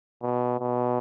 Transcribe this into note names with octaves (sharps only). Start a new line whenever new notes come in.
B2
B2